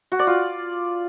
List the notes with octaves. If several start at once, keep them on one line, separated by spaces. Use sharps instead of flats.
F#4
D5
F4